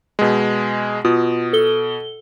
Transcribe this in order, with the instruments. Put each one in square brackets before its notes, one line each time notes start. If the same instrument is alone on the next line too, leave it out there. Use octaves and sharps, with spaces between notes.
[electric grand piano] B2 G#3
[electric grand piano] B2 [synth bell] F4 D#6
[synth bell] A4 G7